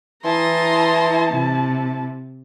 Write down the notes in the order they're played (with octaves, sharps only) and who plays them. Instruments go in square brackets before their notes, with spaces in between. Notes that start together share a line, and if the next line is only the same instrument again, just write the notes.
[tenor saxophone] E3 [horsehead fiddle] E4 A5 [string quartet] A#5 C6 D#6
[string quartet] C3